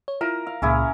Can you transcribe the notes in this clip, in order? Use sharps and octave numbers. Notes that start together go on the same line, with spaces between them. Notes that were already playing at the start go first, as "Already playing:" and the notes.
C#5
E4 F4 A#4
F5
C#2 A#2 C#4 E4 G#4